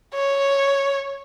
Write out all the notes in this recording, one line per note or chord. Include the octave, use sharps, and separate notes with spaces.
C#5